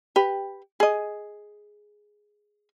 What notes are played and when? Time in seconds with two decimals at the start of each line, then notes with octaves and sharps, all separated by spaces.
0.16 G4 B4
0.80 G#4 D#5